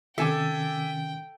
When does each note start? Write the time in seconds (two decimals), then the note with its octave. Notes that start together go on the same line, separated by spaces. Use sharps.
0.18 C3 D#3 C#4 A4 E5 G5 G#5 D6